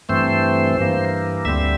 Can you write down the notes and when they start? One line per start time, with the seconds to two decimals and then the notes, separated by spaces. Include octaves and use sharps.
0.09 G2 E3 A3 C4 C5
0.77 G2 E3 A#3
1.45 D2 D3 G3 C4 E5